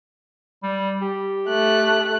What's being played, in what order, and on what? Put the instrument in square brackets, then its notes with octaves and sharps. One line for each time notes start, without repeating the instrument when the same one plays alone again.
[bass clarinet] G3
G4
[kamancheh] A3 F#6